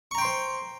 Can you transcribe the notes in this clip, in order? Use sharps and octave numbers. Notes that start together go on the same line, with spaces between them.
C5 G5 A#5 C6 C#6